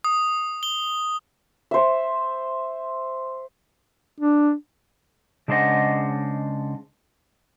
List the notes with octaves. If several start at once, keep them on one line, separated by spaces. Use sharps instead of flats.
D#6
G7
C5 E5
D4
C#3 G#3 D4 C5 D#5 F#5